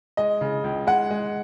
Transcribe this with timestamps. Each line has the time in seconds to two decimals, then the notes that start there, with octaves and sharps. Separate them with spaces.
0.17 G#3 D#5
0.41 C#3
0.64 C#2
0.87 G#3 F#5
1.11 G#3